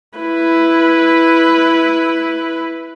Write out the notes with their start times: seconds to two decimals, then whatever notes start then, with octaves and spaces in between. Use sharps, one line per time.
0.18 E4 B4